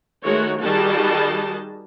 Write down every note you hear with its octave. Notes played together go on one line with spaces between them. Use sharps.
D#3 G#3 A3 F#4 C#5
D#3 G3 F#4 G#4 D#5 A5